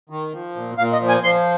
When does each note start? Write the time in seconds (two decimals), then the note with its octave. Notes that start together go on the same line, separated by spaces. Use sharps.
0.10 D#3
0.33 F3
0.56 A#2
0.78 A#2 F5
0.93 D#5
1.00 F3
1.08 G#5
1.23 F3 C6